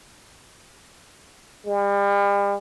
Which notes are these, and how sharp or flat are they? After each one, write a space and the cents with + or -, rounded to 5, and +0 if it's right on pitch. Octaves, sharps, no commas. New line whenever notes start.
G3 +40